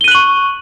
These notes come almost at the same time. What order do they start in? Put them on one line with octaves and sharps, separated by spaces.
G7 D#7 F#6 F#7 C#6